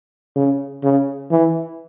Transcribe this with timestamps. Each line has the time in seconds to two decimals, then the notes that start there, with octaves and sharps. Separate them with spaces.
0.36 C#3
0.83 C#3
1.31 E3